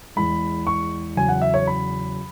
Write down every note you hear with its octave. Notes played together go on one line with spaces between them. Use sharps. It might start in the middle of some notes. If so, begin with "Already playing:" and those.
E2 E3 G#3 B5
C#6
E2 C#3 F#3 G#5
F#5
E5
C#5
B5